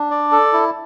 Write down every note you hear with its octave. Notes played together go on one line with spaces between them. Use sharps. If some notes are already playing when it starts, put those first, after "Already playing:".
Already playing: D4
D5
A4
E4